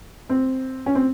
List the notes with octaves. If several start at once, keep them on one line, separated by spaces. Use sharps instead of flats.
C4
C#4
C4